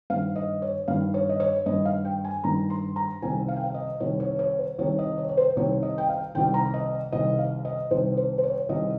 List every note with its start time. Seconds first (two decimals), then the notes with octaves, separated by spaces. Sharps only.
0.10 G2 D#3 F5
0.36 D#5
0.62 C#5
0.88 G2 D#3 F5
1.14 C#5
1.29 D#5
1.40 C#5
1.66 G2 D#3 D#5
1.85 F5
2.05 G5
2.25 G#5
2.44 G2 D#3 A#5
2.70 C6
2.96 A#5
3.22 C2 C3 D#3 G#5
3.48 F5
3.56 G5
3.64 F5
3.74 D#5
4.00 C2 C3 D#3 C#5
4.20 C#5
4.39 C#5
4.59 C5
4.78 C2 C3 D#3 C#5
4.99 D#5
5.18 C#5
5.29 C#5
5.37 C5
5.56 C2 C3 D#3 C#5
5.82 D#5
5.98 G5
6.09 F5
6.35 C2 C3 D#3 G5
6.54 A#5
6.74 D#5
7.12 C2 C3 D#3 D#5
7.39 F5
7.65 D#5
7.91 C2 C3 D#3 C5
8.17 C5
8.38 C5
8.43 C#5
8.57 C#5
8.69 C2 C3 D#3 D#5